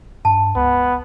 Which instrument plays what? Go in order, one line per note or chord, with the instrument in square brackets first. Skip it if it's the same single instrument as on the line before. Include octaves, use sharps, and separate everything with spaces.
[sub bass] G2 [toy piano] A5
[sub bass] C#2 [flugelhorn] B3